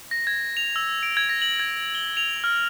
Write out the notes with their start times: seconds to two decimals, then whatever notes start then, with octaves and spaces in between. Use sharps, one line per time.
0.11 A#6
0.27 G#6
0.57 F7
0.76 E6
1.03 D7
1.17 G#6
1.29 A#6
1.42 F#7
1.60 G#6
1.95 G7
2.17 F7
2.44 F6